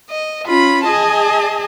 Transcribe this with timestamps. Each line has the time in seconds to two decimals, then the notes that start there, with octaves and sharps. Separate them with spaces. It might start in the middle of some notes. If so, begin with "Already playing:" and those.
0.10 D#5
0.47 C#4 F4 B5
0.87 G#4 D#5 G#5 A5